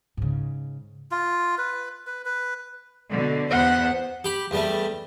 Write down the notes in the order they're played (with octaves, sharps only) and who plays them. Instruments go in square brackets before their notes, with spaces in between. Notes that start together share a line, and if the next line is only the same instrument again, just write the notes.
[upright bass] G#2 C#3
[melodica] F4
B4
B4
B4
[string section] B2 D3
[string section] E2 B3 C5 [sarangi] F#5
[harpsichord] G4 B5
E2 G3 A3